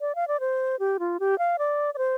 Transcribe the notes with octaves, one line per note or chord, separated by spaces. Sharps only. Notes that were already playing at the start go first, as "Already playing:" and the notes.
D5
F5
D5
C5
G4
F4
G4
F5
D5
D5
C5